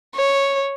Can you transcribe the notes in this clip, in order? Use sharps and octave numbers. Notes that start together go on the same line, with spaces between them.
C#5